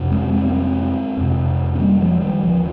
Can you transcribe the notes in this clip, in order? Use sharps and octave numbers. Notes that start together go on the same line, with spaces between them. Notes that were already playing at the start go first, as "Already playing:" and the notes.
Already playing: F2 C3
G#3 C4
G#3 C4
A#3
G#3 C4
F2 C3
C4
G3 A#3
F3 G#3
D#3 G3
D#2 C#3 F3